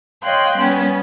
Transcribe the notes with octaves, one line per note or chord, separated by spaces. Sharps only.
C#5 D#5 F5 G5 C6 F#6
G3 B3 C#4